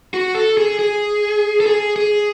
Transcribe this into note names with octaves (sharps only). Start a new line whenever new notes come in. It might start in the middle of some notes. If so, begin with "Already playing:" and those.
F#4
A4
G#4
G#4
A4
G#4
G#4